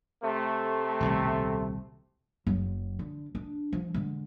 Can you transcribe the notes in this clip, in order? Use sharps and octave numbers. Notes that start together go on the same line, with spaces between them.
C3 A3
D#1 C2 B2
F#1 F#3
D3
D4
F3
D3 G#3